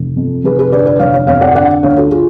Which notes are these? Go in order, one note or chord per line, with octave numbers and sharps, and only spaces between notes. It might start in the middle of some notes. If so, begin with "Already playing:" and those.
Already playing: F1
F2
F1 G#4 B4
G#4 B4
D3 B4 D5
B4 D5
F1 C#5 F5
C#5 F5
F2 C#5 F5
D5 F#5
D3 D5 F#5
D2 C#5 F5
F#4 A4
F4 G#4